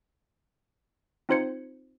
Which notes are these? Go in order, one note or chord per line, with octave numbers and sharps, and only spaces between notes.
C4 D#4 F4 C5 G#6 C#7